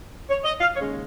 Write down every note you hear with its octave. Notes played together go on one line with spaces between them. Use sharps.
C#5
D#5
F5
D#2 C#3 G#3 C#4 C#5